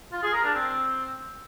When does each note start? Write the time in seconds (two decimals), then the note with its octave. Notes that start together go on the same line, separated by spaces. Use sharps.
0.12 F4
0.23 G#4
0.33 A#4
0.44 D4
0.54 C4